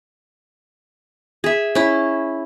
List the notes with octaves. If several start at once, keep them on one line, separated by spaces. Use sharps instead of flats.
G#4 E5
C#4 E4